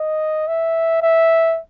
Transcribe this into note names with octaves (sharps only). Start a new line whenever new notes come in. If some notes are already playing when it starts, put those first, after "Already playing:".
Already playing: D#5
E5
E5